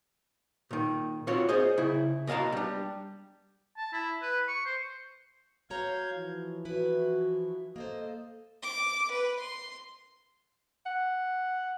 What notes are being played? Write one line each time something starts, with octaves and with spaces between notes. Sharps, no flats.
A#2 D#3
C4 F4 F#4 C#5
G#4 C5 D#5
C#3 E4
B2 D#5 F5 A5 A#5
G3 D4
A5
E4
B4
C#6
C5
F#4 C#5 F5 A#5 G6 G#6
E3 F3
E4 F#4 B4
A#3 A4 C5 D#5
D6
B4
C6
F#5